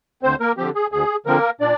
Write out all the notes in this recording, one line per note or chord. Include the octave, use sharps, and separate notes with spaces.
D2 C4 C5
A#3 A#4
D3 F3 C4 G4
G#4
D2 G#4
D3 F3 A#3 C4 A#4
A#2 D4 D5